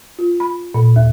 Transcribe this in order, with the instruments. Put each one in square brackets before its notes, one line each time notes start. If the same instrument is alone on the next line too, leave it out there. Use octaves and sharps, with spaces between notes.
[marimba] F4
B5
A#2
D#2